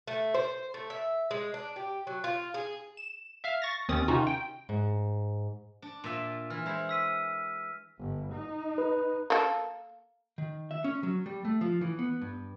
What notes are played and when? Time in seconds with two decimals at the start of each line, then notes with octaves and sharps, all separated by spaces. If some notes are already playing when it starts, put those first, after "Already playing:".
0.07 A3
0.34 C5
0.74 A3
0.90 E5
1.31 G#3
1.54 D4
1.76 G4
2.07 F#3
2.24 F4
2.54 G#4
2.97 E7
3.44 E5 F5 F6
3.62 C#6 A6 A#6
3.89 D#2 D#3 C4 C#4 D#6 A6
4.08 C3 D#3 C#4 D#4 F4 F#4
4.27 G5
4.69 G#2
5.82 D4
6.04 A#2 F4 E5
6.50 E3 F6
6.66 G#3 E4 C5
6.89 E6 B6 D#7
7.99 G1
8.33 D#4
8.78 B4
9.30 A#3 A4
10.38 D#3
10.71 E5
10.84 C#4
11.03 F#3
11.26 G3
11.45 A3
11.61 F3
11.81 E3
11.99 B3
12.21 G2